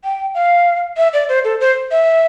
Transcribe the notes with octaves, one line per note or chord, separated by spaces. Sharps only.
G5
F5
E5
D5
C5
A4
C5
E5